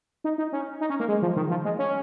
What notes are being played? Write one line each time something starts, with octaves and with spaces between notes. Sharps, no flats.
D#4
D#4
C#4
D#4
C#4
A#3
G#3
F3
D#3
F3
G#3
C#4